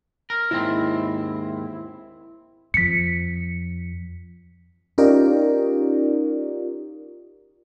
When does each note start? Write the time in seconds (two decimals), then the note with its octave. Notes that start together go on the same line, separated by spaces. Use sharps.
0.30 A#4
0.51 D#2 G#2 C4 E4
2.74 F2 F3 B6 C#7
4.98 C#4 D#4 F4 G4 A#4 D5